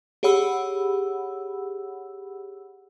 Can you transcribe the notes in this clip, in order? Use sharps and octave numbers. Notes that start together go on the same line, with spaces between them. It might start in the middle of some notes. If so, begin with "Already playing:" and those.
G4 G#4 C#5 F#5 B5 E6